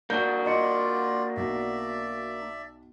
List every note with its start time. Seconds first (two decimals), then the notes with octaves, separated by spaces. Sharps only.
0.10 A#3 D4 F#4 G6
0.46 F4 D5 D#5 C#7
1.37 B1 D5 E5